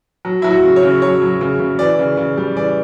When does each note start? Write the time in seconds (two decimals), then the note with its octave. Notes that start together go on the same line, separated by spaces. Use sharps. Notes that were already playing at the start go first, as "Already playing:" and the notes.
0.25 F#3
0.42 F#3 E4
0.51 F#4
0.63 C#3
0.76 C#5
0.83 C#3
1.02 F#3 C#5
1.22 F#3
1.41 C#3
1.60 C#3
1.79 E3 D5
1.99 C#3
2.17 C#3
2.37 G3
2.57 E3 D5